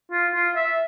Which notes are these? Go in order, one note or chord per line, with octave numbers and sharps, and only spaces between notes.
F4
F4
E5